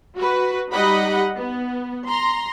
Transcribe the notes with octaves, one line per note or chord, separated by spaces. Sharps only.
F#4 B4
G3 D#4 G4 D#5 F#5 B5
B3
A#5 C6